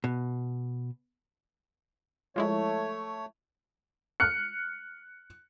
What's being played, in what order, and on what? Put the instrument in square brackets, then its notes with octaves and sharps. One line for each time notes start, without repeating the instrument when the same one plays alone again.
[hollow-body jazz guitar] B2
[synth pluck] F3 G#3 E4 [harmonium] A3 C#5
[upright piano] F6 F#6 C#7